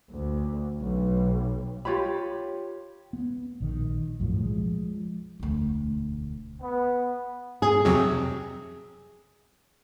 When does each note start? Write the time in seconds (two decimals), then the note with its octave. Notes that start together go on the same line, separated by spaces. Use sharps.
0.11 D2
0.81 B1
1.85 F4 G4 C#5 B5
3.13 B3
3.60 A#1 D#3
4.20 B1 F#2 A2 F3
4.41 F3 G#3
5.40 E1 D2
6.62 B3
7.62 G#4
7.85 F2 C3 F#3